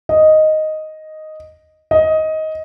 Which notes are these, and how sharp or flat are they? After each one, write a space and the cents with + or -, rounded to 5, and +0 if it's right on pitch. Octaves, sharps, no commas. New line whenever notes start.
D#5 +0
D#5 +15